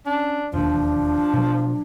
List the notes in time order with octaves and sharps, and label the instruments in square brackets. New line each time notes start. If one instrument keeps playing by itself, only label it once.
[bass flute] C#4 [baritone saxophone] D4
[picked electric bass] E1 D#2 [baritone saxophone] F3 [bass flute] D4
[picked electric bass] B2 F#3